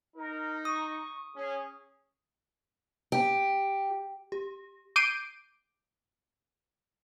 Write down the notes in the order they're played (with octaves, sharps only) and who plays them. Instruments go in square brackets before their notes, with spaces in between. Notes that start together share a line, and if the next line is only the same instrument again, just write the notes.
[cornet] D#4 [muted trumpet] A#4
[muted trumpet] C#6 [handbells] D#6
[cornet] C#4 [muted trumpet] G#4
[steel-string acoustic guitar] G4
[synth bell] G4
[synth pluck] D6 G6 C7 D7 D#7